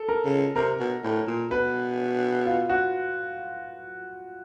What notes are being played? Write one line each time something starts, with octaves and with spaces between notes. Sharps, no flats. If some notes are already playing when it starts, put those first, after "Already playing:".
Already playing: A4
A#4
C#3
C3 A#4
B2
A2
A#2
B2 B4
F4
F#4